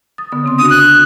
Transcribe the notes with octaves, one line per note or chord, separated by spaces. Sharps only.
D#6 A6
D3 B3 D#6
C#3 C4 C6
D4 F#4 D#6
F#6